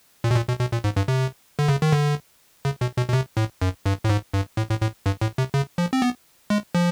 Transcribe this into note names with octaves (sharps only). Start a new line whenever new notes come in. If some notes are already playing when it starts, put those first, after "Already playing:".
A#2
B2
A#2
B2
B2
A#2
G#2
G2
C3
D3
C#3
D#3
D3
C#3
B2
B2
B2
C3
A2
F#2
G2
A2
G#2
G2
A2
A2
A2
G2
A2
C3
C#3
F3
C4
B3
G#3
F3